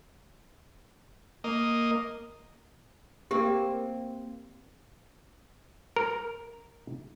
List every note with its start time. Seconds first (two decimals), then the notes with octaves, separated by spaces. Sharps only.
1.44 A#3 D#5
3.31 A#3 C4 G4 A#4
5.96 A#4